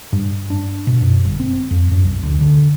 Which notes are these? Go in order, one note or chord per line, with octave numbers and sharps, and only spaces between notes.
G2
D4
B2
F#2
G1
C4
F2
F#2
B1
D2
D3